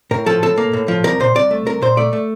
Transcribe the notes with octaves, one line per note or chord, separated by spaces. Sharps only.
A2 A#4
F3 A4
A2 A4
A#3
A2
F3
C2 A#4
A#2 C5
C2 D5
A3
C2 A#4
A#2 C5
A3 D5
A3